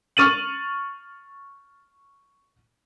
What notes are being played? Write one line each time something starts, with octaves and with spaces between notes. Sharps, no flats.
C#6 F6 A6 D#7 F#7